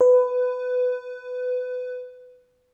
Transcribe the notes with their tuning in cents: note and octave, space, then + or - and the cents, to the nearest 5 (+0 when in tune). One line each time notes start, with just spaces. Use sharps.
B4 +20